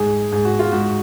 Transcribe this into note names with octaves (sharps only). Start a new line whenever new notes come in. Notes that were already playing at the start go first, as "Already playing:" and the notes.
Already playing: G#2 G#4
G#2 G#4
F#4
F4
G#2 F#4